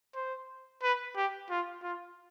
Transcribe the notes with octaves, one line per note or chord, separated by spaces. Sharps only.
C5
B4
G4
F4
F4